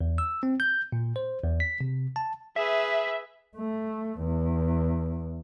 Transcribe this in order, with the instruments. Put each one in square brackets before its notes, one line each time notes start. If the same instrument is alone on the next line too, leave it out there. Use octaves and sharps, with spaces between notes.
[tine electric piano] E2
E6
C4
G6
A#2
C5
E2
B6
C3
A5
[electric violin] G#4 B4 [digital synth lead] E5
[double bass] A3
E2